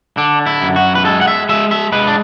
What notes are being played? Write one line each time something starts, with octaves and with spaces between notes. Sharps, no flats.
D3 D4
E4
F#2
F#4
B4
G#3 A4
F#5
E5
G#3 E5
E5
G#3 B4
D4